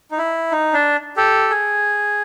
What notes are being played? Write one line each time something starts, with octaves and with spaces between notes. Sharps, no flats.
D#4
E4
D#4
D4
G4 A4
G#4